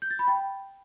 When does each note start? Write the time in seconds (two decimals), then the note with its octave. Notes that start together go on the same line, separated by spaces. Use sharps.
0.02 G6
0.11 A6
0.19 B5
0.28 G5